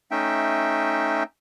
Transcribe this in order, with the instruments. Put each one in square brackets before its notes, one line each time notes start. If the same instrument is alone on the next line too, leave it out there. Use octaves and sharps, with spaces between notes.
[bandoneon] A3 C#4 D#4 E5 G5